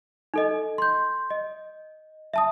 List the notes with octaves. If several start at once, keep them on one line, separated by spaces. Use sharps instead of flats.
D#4 A4 D#5
C6 G6
D#5
E5 A5 D#6